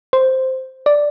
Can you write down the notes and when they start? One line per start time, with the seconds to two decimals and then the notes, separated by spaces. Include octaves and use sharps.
0.13 C5
0.86 D5